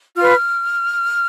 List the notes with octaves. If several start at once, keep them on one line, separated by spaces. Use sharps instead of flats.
F4 B4 F6